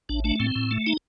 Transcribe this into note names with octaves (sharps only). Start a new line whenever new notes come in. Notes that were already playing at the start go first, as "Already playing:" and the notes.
A1 D4
A3 D4
A2 C4
A2
A3
D#4